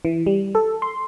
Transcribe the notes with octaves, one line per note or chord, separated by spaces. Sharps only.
E3
G3
A4
C6